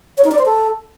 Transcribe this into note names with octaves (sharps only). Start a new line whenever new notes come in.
C#5
D#4
D5
C5
A4